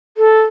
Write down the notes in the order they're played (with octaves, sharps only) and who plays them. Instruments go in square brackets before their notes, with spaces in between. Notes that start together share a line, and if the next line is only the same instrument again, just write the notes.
[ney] A4